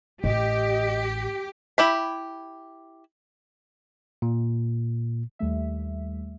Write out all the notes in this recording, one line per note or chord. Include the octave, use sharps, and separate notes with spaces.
A1 G4 D#5
E4 G4 B5
A#2
D#2 G3 A3 E5